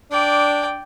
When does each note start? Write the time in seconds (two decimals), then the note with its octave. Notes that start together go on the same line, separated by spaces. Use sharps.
0.11 D4 D5 G5